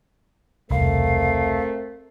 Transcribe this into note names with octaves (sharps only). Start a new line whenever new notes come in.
E1 C2 A3 C4 A#4 F5